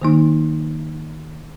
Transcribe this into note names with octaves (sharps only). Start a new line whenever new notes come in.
D#3 F#3 A#3 D#4